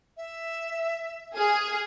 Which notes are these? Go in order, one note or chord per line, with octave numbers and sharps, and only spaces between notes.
E5
G#4 F6